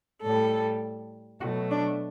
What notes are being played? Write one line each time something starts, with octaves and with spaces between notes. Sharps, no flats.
A2 G3 A4
B2 F#3 A3 F#4
D4